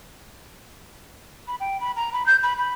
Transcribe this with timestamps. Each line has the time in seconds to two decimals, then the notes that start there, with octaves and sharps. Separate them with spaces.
1.48 B5
1.60 G5
1.81 B5
1.96 A#5
2.13 B5
2.26 G6
2.43 B5
2.58 B5